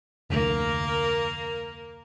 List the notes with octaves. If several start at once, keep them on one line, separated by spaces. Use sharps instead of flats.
F1 D2 A#3 A#4